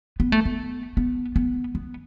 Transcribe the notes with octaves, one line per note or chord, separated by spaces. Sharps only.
B3
A3
B3
B3
B3
B3